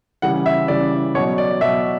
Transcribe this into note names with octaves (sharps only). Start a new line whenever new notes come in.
C#3 E3 G3 F#5
E5
C#3 E3 G3 D5
B2 F#3 C#5
D5
B2 F#3 E5